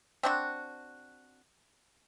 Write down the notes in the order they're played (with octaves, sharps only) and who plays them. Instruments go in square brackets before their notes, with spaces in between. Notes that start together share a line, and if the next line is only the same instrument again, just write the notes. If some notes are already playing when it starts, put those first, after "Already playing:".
[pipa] C4 D4 F#4